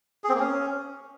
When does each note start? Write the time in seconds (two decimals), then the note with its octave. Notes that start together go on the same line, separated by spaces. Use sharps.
0.24 G#4
0.29 C4
0.34 A#3
0.39 C#4